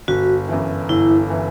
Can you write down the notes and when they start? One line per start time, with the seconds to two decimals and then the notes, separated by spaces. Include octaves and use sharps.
0.08 G1 F#4
0.49 F#2 E3
0.89 G1 E4
1.30 E3